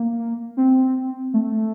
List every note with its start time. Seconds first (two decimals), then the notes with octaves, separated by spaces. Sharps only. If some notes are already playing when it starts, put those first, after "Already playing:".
Already playing: A#3
0.57 C4
1.34 A3